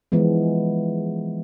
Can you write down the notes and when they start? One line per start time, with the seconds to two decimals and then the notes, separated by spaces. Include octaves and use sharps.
0.12 E3 F3 G#3 B3